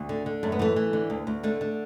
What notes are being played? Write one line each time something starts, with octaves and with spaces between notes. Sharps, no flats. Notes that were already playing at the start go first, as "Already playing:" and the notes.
Already playing: D2
D3
D3
F#2 A3
B3
E3 A3
E3
D3
D2
D2
D3 A3
D3